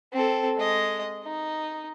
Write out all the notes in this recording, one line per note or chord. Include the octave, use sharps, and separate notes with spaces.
C4 A4
G#3 D#5
D#4